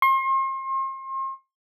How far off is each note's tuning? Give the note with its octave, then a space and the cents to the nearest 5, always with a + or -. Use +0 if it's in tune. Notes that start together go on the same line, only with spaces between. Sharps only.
C6 +40